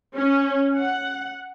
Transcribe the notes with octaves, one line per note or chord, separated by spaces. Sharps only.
C#4
F#5